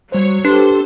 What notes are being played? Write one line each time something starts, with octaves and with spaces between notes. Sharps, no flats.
F#3 G3 C5 C#5
D4 G4 A4 B4 C5 C6